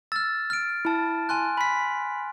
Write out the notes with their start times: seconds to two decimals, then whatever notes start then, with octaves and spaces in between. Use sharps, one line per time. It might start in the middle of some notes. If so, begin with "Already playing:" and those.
0.12 E6 F6 A6
0.50 F6 D7
0.85 E4 A5
1.29 G#5 C6 F#6
1.57 B5 B6